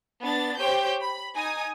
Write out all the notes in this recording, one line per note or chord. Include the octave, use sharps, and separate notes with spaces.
B3 D4 A6
G4 C5 C#5 G5 G6
B5
D#4 G#5 D#6